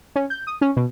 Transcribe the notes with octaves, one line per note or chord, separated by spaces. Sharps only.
C#4
G6
D#6
C#4
B2